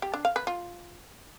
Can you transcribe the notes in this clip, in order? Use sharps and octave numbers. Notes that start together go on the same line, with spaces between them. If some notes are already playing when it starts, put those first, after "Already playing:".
G4
D4
F5
B4
F4